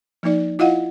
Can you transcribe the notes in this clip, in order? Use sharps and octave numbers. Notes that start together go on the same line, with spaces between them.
F3 A#3 D#4 D5
E4 F4 D#5 F5 F#5